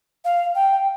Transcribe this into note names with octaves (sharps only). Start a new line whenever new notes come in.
F5
G5